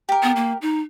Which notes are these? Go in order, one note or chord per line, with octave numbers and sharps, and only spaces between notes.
G4 A#4
B3
A#3
D#4